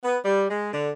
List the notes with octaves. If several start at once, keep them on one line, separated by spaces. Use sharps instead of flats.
B3
G3
G#3
D3